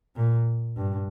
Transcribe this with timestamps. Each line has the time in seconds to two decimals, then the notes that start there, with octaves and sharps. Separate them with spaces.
0.16 A#2
0.77 G2